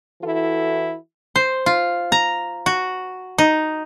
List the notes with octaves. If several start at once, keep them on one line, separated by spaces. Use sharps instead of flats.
E3 E4 F#4 A4
C5
F4
A#5
F#4
D#4